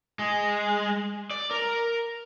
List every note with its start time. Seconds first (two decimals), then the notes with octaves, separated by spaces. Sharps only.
0.19 G#3
1.31 D5
1.51 A#4